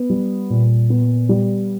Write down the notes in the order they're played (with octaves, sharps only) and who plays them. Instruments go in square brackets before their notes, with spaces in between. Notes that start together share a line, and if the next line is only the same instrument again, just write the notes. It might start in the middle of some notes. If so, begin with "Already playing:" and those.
Already playing: [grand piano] B3
G3
A#2
B3
G3